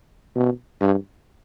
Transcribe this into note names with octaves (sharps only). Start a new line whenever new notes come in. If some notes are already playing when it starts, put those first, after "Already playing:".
B2
G2